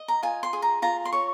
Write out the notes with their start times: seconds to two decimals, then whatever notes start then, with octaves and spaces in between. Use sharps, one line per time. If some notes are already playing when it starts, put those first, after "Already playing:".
Already playing: D#5
0.08 A#5
0.23 F4 G#5
0.43 C6
0.53 G#4
0.62 A#5
0.82 F4 A#5
1.05 C6
1.12 C#5 C#6